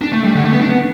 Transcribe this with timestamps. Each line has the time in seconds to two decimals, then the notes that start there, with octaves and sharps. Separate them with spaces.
0.01 D4
0.13 A3
0.24 G3
0.35 D3
0.44 A3
0.53 B3
0.61 D4
0.70 B3